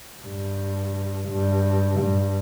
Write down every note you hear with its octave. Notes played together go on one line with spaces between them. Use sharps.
G2
G2
G2